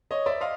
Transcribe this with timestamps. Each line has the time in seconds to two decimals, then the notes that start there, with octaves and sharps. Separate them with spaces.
0.11 C#5 D#5
0.26 D5 E5
0.41 D#5 F5